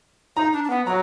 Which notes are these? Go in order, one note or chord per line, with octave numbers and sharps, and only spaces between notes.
D#4 A#5
D4
D4
B3
F#3 A#5